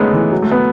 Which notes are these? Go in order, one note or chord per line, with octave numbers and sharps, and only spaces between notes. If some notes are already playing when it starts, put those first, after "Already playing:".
Already playing: G#3 A3 B3 C#4 D#4
E3
F#3
A3
B3